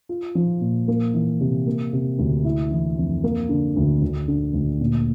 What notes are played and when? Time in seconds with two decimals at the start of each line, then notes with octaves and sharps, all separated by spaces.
0.09 F4
0.35 F3
0.61 A#2
0.88 A#3
1.14 E3
1.40 C3
1.67 A#3
1.93 C3
2.19 D2
2.44 E4
2.71 E3
2.98 F2
3.24 A#3
3.49 D3
3.76 D2
4.02 D2
4.28 D3
4.54 D2
4.81 A#2